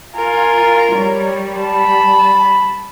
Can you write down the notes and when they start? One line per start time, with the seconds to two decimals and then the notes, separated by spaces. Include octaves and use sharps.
0.15 F4 A#4 G#5
0.95 G3 C#5
1.58 A5 B5